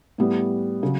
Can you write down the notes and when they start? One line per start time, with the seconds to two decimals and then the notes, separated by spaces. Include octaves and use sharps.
0.18 A2 G3 B3
0.83 C#3 F#3